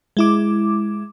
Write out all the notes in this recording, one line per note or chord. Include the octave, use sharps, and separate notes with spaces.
G#3 E4 D6